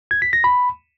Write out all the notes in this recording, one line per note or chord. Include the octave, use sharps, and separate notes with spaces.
G#6
B6
A#6
B5